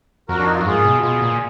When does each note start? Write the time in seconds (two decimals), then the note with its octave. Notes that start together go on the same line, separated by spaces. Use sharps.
0.28 F2 F#4 A#4
0.38 D4
0.46 D#4
0.53 F4
0.59 F#2 F#4
0.66 G#2 F4 G#4
0.85 B2
1.03 B2 F4 G#4
1.22 A#2